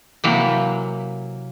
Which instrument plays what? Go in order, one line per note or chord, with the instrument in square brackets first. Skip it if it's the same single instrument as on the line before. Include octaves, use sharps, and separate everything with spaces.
[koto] C3 E3 F#3 [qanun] A#3